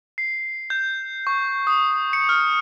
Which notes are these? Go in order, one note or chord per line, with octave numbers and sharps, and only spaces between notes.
C7
G6
C#6
D#6
C#7
F6